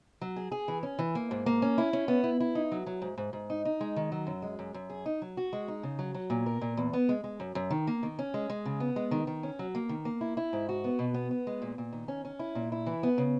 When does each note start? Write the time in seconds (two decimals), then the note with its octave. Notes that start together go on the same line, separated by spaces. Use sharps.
0.21 F#3
0.36 G#4
0.52 G#4
0.68 E3
0.83 C#4
0.99 E3
1.15 A#3
1.31 G#2
1.46 A#3
1.62 C#4
1.78 E4
1.93 C#4
2.08 B3
2.24 E4
2.40 E4
2.55 D#4
2.72 F#3
2.86 F#3
3.02 G#2
3.18 G#2
3.33 G#2
3.50 D#4
3.65 D#4
3.81 G#3
3.96 D#3
4.12 F#3
4.27 F#2
4.42 G#3
4.59 F#2
4.74 F#2
4.89 G#4
5.06 D#4
5.22 F#3
5.37 F#4
5.53 G#3
5.68 D#4
5.83 C#3
5.99 F#3
6.14 F#3
6.30 A#2
6.46 A#4
6.61 A#2
6.77 E2
6.93 B3
7.09 G#3
7.24 G#3
7.40 F#2
7.55 F#2
7.71 D#3
7.87 A#3
8.03 D#3
8.19 C#4
8.34 G#3
8.50 G#3
8.65 C#3
8.80 B3
8.96 G#3
9.11 D#3
9.27 D#3
9.43 C#4
9.59 F#3
9.75 A#3
9.89 D#3
10.05 A#3
10.21 E4
10.37 E4
10.53 G#2
10.69 F#4
10.84 B3
10.99 B2
11.14 B3
11.31 B3
11.47 G#3
11.62 A#2
11.78 A#2
11.93 D#3
12.08 C#4
12.25 C#4
12.39 E4
12.55 A#2
12.72 E4
12.86 E3
13.03 B3
13.18 C#3